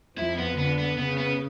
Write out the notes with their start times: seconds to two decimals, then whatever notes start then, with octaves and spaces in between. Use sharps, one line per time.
0.18 F2 F3 E4
0.38 B3
0.58 D3 B3
0.79 B3
0.98 C#3 B3
1.18 B3